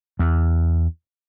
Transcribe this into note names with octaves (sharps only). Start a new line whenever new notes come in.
E2